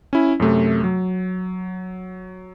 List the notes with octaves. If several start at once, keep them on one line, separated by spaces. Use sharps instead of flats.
C#4 E4
F#2 C3 A3
F#3